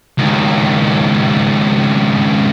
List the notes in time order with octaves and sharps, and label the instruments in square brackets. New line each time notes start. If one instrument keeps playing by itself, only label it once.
[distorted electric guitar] C#2 D#3